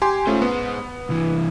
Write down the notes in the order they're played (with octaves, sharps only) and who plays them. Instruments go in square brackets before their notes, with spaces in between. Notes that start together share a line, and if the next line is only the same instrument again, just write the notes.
[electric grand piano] G4 G#5 C6
[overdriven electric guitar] G#3 C5 [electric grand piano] A3 C#4 F4
[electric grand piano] B3
[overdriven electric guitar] C2 E3